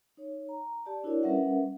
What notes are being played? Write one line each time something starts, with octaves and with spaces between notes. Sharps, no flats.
D#4 C#5
A#5
G4 D5 A5
D4 E4 F#4 A#4 C#5 D5
G3 C#4 A#4 B4 E5 F#5